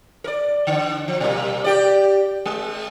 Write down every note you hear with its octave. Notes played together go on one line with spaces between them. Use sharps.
A#4 D5
D3
F3
B2 G3 A#3
G4 D5
G#3